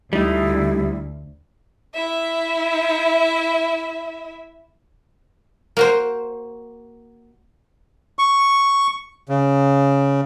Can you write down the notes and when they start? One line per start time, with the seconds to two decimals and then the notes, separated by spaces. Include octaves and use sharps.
0.13 D2 G3 D#4 E4
1.94 E4 E5
5.77 A#3 F#4 C5
8.19 C#6
9.29 C#3